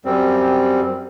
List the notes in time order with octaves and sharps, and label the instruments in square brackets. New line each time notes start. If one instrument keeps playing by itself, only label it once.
[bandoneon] F#2 G3 C4